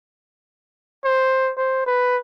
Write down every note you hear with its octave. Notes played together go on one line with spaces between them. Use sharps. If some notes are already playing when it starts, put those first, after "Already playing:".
C5
C5
B4